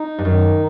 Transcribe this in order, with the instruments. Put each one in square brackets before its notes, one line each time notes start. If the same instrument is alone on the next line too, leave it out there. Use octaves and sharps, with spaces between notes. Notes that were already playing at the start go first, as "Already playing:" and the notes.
Already playing: [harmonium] D#4
[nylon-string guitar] G2
[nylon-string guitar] F#2 [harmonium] D#3